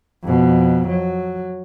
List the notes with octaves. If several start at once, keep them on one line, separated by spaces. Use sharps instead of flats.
F2 B2
F#3